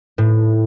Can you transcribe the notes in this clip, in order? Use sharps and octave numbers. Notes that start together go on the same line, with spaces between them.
A2